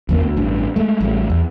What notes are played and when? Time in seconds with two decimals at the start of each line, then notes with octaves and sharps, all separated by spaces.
0.09 G1 E2 A#3 B3
0.21 D2
0.37 A1 G2
0.76 G#3 A3
1.00 A1 G3 A3
1.30 E2